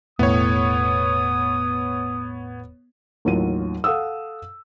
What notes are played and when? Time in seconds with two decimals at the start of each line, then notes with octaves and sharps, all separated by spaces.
0.19 E1 A2 B3 C#5 D#6
3.25 A1 D#2 F#3 F4 D#7
3.84 A4 F5 F#5 D#6 E6